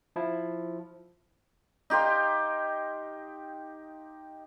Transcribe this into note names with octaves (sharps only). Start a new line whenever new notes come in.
F3 E4
D#4 G4 F5 C6